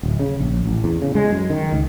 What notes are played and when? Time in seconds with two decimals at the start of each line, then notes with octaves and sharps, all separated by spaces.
0.03 D1
0.19 C#3
0.40 A#1
0.66 A1
0.84 E2
1.02 C#3
1.15 G#3
1.32 F#2
1.50 D#3
1.72 C#2